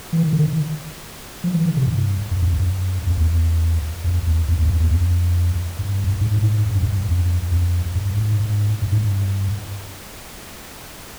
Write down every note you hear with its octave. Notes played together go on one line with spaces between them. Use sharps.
E3
D#3
D3
D#3
F3
E3
D#3
C3
G2
F#2
F2
F#2
F2
E2
F2
E2
F2
E2
F#2
F2
E2
F2
G2
F#2
G2
G#2
A2
G#2
G2
F#2
G2
F2
F2
G2
G#2
G#2
G2
G#2
G2